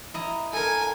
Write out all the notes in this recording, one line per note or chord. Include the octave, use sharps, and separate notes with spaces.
E4 D#5 A#5
A4 A#4 G#5